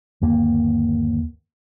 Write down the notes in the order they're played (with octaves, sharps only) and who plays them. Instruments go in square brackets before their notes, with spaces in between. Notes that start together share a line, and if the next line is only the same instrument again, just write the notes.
[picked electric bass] G1 D#2 A#3